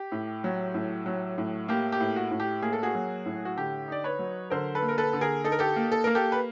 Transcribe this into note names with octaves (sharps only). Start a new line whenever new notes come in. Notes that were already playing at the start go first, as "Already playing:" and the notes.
Already playing: G4
A2
F#3
A2
F#3
A2
A#3 G4
G4
A2
F#4
A2
G4
A#3 G#4
A4
F#4 G#4
F#3
A2
F#4
D3 G4
D#4 D5
B4 C#5
F#3
D3 A#4 C5
A4 B4
A#3
A#4
A4 B4
D3
G#4 A#4
D#4 A4
A#4
G4 A4
A#3
A4
A#3 A#4
G4 A4
B4